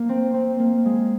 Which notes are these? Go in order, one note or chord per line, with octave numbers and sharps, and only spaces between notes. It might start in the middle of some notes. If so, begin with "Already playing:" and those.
Already playing: A#3
C4
C4
A#3
G#3